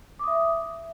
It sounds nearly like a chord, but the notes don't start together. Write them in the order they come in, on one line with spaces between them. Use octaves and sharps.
D6 D#6 E5